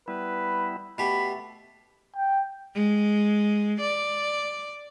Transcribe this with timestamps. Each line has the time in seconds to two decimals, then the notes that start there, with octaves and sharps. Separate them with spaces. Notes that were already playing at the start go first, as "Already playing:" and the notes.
0.08 G3 B3 E4 B4
0.98 B2 A3 G4 B5
2.16 G5
2.75 G#3
3.81 D5